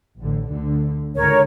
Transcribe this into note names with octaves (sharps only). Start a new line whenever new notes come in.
A1 D3
D2 D3
C#2 G#2 D3 A#4 C#5